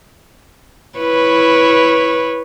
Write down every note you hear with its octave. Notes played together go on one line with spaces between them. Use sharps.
E4 B4 C#5